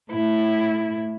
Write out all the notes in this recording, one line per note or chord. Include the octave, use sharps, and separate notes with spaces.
A2 E4